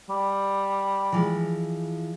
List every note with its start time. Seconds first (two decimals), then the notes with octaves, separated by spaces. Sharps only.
0.10 G3
1.12 E3 F3 G#3